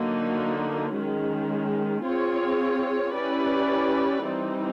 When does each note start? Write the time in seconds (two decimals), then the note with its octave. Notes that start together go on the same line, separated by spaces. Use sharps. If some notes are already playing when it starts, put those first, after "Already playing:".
Already playing: D3 F#3 A#3 D#4 F#4
0.94 D#3 G#3 C#4
2.04 C4 F4 G#4 C#5
3.14 C#4 E4 G4 B4 D5
4.25 E3 G3 C4 D#4